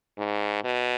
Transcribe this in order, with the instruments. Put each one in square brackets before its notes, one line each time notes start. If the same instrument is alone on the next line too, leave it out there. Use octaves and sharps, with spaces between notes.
[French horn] G#2
B2